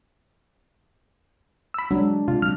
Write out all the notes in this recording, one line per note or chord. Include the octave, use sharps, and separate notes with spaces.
B5 E6
F#3 G#3 D4
C3 F4
F#3 F6